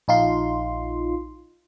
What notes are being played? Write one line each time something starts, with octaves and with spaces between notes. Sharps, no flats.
A#1 D#4 F4 C6